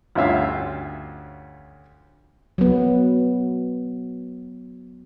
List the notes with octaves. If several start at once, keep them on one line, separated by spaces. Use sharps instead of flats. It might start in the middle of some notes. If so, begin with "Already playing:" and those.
D2 G2 C#4 F4 E5 F5
F#3 B3